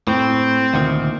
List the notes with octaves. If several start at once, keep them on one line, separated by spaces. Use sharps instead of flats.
A2 C4
D2 A#2 D#3